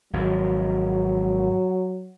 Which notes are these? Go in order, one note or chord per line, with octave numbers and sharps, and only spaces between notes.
G#1 F2 F#3